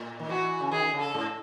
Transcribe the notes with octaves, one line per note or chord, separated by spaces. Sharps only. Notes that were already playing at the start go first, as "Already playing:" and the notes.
Already playing: A2
D#3
E3 F#4
C#3
D#3 G#4
C#3
A4
G#2